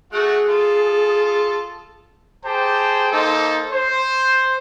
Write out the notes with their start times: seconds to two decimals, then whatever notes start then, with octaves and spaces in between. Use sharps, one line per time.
0.13 A3 F#4 G#4 F#5
0.49 F4 A4
2.45 G4 G#4 C5 G5 A5
3.12 A#3 D#4 A4 C5
3.71 C5